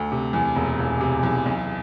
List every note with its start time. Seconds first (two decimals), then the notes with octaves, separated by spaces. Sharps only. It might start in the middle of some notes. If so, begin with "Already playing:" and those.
Already playing: D2 A4
0.12 C3
0.33 E2
0.56 E1
0.79 E1
1.01 C3
1.23 E2
1.46 B1